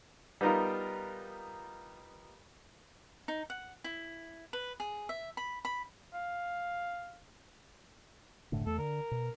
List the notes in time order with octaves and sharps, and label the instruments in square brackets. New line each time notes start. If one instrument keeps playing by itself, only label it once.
[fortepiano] G3 B3 D#4 F4 A#4
[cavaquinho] D#4
F#5
E4
B4
G#4
E5
B5
B5
[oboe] F5
[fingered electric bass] F#1 A2 D3
[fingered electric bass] E2 A3 [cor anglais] A4
[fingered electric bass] D3 [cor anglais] A#4
[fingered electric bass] B2